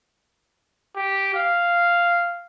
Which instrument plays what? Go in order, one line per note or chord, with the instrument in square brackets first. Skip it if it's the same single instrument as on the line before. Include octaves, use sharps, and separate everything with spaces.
[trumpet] G4
F5